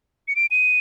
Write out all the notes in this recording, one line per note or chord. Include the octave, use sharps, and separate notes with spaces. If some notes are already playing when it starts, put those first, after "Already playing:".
C#7
D7
D#7